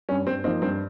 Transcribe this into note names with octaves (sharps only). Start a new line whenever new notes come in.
G2 G3 C#4
G2 C4
F3 A#3 C4 D#4
G2 C4